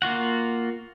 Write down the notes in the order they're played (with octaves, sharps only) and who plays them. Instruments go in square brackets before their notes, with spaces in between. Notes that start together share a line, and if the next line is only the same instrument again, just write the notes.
[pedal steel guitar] A#3 F4 F#4 F#5